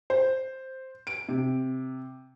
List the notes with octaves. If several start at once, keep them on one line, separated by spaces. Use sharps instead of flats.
C5
D7
C3